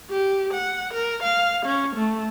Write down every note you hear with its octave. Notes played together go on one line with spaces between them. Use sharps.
G4
F#5
A#4
F5
C#4
A3